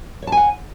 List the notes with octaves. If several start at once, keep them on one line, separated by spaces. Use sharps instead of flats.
C#5 F#5 G#5 A5